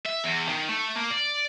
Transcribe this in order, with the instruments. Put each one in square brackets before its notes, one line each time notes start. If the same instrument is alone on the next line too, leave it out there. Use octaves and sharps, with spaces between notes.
[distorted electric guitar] E5
E2
D#3
A3
A#3
D5